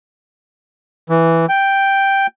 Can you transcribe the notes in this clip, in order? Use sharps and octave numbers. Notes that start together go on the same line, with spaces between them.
E3
G5